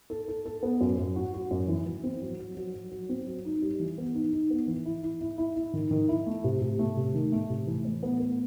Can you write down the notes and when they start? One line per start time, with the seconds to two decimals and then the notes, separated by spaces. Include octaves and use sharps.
0.10 A4
0.28 A4
0.46 A4
0.63 B3
0.81 F#2
0.98 F#2
1.16 F#4
1.34 F#4
1.51 F#2
1.68 E3
1.86 E3
2.03 C4
2.21 F#3
2.39 F#3
2.57 F#3
2.74 F#3
2.91 F#3
3.09 C4
3.27 F#3
3.45 D#4
3.62 G3
3.80 E3
3.98 B3
4.14 D#4
4.33 D#4
4.50 B3
4.67 E3
4.85 E4
5.03 E4
5.21 E4
5.38 E4
5.56 E4
5.74 D#3
5.91 D#3
6.09 E4
6.26 A3
6.44 C3
6.62 C3
6.79 A3
6.97 C3
7.14 D#3
7.32 A3
7.50 C3
7.67 E3
7.85 A2
8.03 B3
8.20 B3